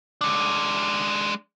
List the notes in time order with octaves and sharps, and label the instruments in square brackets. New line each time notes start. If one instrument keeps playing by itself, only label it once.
[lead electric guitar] G#3 D4